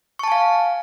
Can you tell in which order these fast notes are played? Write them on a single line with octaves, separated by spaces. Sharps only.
C#6 A5 G#5 F5